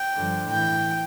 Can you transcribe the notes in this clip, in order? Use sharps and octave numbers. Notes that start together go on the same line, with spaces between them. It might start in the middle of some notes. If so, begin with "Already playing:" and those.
Already playing: G5
G2 D3 F3
A2 E3 G5